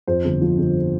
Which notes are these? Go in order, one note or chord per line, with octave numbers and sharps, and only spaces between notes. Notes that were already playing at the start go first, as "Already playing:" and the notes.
F2 C5
G1
F3
G1